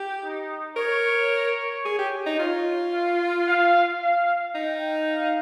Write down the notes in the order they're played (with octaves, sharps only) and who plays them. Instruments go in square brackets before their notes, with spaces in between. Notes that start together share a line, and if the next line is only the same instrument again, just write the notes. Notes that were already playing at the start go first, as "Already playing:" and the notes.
Already playing: [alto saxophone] G4
[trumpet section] D#4
[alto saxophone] A#4 [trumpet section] C#5
[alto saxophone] G#4
G4
D#4
[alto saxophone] F4 [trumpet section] C#5
[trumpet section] F5
F5
F5
[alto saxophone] D#4 [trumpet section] G5
[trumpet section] F5